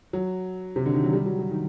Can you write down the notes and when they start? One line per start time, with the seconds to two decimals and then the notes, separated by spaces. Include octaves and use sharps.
0.13 F#3
0.76 C3
0.86 D3
0.94 D#3
1.04 F#3
1.13 G3
1.26 F#3
1.39 F#3
1.51 D#3